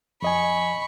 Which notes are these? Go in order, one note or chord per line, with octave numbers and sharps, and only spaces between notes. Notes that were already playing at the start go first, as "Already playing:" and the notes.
F2 D#5 G#5 B5 C#6